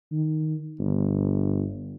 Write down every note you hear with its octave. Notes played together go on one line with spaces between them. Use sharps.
D#3
G1